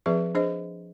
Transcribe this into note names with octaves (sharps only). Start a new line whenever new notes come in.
F3 C4 G#4 B4 D5 E5
D4 G#4 C5 D#5